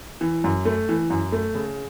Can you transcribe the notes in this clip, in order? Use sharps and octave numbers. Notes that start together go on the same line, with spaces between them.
E3
F#2
A3
E3
F#2
A3
C#3